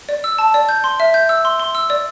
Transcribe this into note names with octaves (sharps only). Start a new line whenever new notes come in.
D5
E6
A5
D5
G6
C6
E5
G6
E6
C6
C6
E6
D5